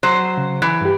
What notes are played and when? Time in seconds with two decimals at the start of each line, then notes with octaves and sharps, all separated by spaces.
0.03 F#3 C5
0.37 C#3
0.62 E3
0.81 G2 G4